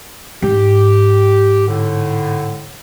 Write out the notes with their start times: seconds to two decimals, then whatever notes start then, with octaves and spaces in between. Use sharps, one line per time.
0.42 G#2 G4
1.68 A2 D3